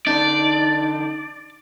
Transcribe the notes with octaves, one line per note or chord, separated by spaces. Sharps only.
D3 D4 D#4 D5